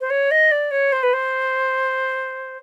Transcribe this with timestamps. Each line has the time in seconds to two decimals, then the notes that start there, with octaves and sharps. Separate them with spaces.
0.01 C5
0.10 C#5
0.31 D#5
0.51 D5
0.71 C#5
0.92 C5
1.03 B4
1.13 C5